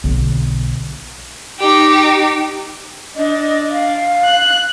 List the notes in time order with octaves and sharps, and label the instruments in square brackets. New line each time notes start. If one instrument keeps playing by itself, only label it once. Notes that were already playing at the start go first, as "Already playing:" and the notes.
[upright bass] B1 D3
[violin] D#4 G4
[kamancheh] D4 [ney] D#5
[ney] F5
[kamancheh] F#6